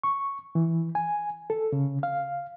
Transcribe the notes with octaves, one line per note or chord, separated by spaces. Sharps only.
C#6
E3
G#5
A4
C#3
F5